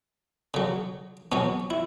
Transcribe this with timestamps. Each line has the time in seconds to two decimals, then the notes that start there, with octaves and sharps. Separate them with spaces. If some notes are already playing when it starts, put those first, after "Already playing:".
0.54 C#3 F#3
1.32 B2 F#3 C#4
1.70 E4